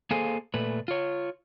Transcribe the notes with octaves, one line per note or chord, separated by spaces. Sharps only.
A#3 G#4 A4 C5 F5 G#5
A#2 A3 B4
F4 C#5